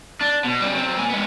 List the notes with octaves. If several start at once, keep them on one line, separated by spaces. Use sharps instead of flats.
D4
B2
C#3 G3
F#3 C4
A#3 G#5
G#3 B3